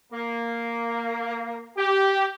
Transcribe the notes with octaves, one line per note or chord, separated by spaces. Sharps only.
A#3
G4